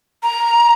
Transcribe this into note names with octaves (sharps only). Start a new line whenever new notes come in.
A#5